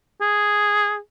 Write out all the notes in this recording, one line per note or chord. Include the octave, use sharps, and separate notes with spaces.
G#4